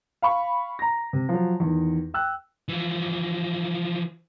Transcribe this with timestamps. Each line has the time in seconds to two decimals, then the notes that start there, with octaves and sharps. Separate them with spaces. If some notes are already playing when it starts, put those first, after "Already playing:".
0.22 F5 B5 C#6
0.79 A#5 A#6
1.13 C3
1.29 F3 F#3
1.60 E2 D#3
2.14 G5 E6 F#6
2.68 E3 F3